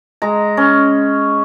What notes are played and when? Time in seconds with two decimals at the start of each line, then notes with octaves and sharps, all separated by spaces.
0.22 G#3 A#5
0.57 C#4